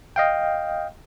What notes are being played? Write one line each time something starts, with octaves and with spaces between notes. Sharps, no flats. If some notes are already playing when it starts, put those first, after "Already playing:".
D#5 F5 G5